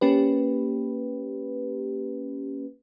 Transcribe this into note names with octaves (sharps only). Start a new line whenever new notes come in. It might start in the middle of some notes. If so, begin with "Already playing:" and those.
A#3 C#4 G4 B4